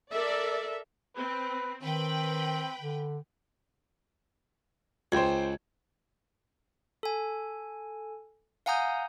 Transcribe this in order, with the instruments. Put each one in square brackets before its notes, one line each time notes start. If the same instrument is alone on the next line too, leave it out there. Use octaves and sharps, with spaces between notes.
[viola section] A4 A#4 E5 [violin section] D5
[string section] C4 [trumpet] B4
[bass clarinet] D#3 [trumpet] C4 [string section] B4 G5 B5
[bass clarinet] D3
[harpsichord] C#2 [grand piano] C5 G5 G#6
[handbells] A4 G#5
F5 F#5 G#5 A#5 D#6 G6